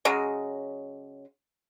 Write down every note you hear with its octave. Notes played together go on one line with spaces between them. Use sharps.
C#3 F#3 G#3